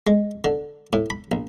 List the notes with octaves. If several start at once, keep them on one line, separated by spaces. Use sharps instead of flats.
G#3
D3
A2
B5
A#1